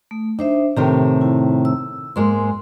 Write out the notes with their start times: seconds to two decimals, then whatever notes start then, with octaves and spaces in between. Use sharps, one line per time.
0.11 A3
0.39 D4 D#4 C5 E5
0.77 A2 C3 D#3 G4
1.21 E4
1.65 E6
2.16 G#2 G#3 A#3 C6